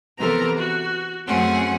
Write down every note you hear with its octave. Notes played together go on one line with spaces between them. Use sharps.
C3 E3 B3 A4 A#4 A#5
F#4
F#2 A3 C4 C#4 G#4 F#5